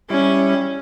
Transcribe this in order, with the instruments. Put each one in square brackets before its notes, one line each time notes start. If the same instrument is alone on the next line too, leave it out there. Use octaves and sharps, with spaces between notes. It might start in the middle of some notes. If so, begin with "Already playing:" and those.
[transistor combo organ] G3 E4 [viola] C#4